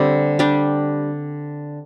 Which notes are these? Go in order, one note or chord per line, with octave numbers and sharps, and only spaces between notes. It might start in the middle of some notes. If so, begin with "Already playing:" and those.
Already playing: D3 G3 C4 G4
G3 D4 G4